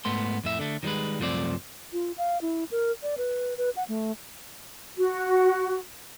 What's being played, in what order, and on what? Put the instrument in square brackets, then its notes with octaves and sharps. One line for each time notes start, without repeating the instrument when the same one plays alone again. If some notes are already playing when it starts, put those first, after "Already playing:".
[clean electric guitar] G#2 A3 B3 C6
F2 A2 E5
D3 A3
D#3 F3 G3 G#3 B4
C2 F#2 F3 A3 C4 D5
[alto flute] F4
F5
E4
A#4
D5
B4
B4
F#5
A3
[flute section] F#4